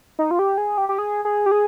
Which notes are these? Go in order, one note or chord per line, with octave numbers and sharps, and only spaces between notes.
D#4
F4
G4
G#4
G4
G4
G#4
G#4
G4
G#4